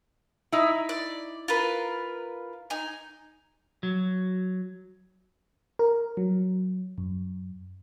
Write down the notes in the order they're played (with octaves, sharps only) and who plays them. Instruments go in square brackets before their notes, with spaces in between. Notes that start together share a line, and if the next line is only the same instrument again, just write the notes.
[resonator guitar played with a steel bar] D#4 E4
[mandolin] D5
F4 A#4 B4
D#4 G#5
[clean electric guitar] F#3
[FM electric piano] A#4
F#3
F#2